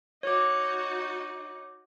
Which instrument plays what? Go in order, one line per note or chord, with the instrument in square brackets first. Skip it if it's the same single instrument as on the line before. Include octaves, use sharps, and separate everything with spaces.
[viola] D#4 F#4 [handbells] C#5 D6